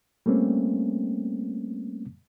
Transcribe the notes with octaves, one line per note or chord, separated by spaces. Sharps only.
G3 A3 A#3 C4 C#4